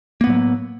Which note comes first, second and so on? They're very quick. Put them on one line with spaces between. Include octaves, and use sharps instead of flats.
A#3 B3 A2 F#3